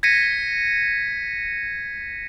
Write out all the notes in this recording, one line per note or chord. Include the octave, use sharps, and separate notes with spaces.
G#6 A#6 B6 C#7 D#7